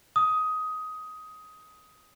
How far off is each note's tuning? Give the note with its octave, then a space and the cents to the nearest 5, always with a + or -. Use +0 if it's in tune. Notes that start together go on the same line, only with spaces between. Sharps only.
D#6 +15